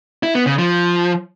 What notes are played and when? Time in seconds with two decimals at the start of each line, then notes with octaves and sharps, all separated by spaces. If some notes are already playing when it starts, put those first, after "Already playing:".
0.23 E4
0.35 B3
0.47 C#3
0.58 F3